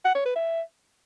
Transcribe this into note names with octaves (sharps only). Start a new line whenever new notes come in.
F#5
C#5
B4
E5